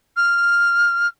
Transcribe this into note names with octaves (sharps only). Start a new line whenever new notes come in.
F6